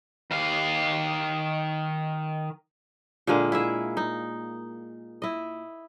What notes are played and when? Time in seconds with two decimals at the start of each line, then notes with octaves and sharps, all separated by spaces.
0.31 D#3 F5
3.27 A#2 D3 G#3 A#3
3.52 E4 G#4 E5
3.97 D#4
5.22 E4 D#5